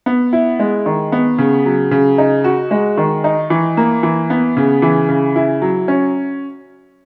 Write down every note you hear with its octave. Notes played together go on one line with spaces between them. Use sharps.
B3
E4
G#3
D#3
B3
C#3
F#3
C#3
D#4
F#4
G#3
D#3
D#4
E3
A#3
E3
B3
C#3
E3
C#3
E4
F#3
C#4